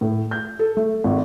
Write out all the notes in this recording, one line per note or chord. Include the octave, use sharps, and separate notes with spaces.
A2
G6
A4
A3
G#1